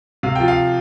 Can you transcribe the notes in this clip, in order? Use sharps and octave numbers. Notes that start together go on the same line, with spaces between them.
C3 F5
F3 G5
F5